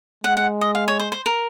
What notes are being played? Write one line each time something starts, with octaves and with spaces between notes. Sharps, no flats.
G#3 F#5
F#5
D#5
F5
C#5
C5
C5
A#4